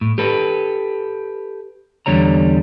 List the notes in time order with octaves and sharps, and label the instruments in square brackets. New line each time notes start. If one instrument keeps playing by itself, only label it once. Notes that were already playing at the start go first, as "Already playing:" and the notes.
[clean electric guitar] A2
G4 A4 B4
E2 D3 G3 C#5 A#5